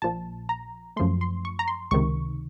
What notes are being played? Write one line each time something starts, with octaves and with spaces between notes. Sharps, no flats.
A#1 A#2 F3 A5
A#5
F#2 F3 A3 C6
C6
C#6
A#5
C6
C#2 C3 D#3 C#6